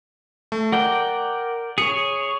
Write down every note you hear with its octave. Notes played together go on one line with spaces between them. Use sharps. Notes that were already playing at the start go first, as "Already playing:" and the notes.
A3
A#4 D5 F#5 G5
G#4 C#5 C#7